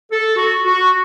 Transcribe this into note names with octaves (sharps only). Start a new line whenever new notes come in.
A4
F#4
F#4